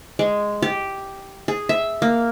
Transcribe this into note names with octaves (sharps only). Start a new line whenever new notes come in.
G#3
G4
G#4
E5
A#3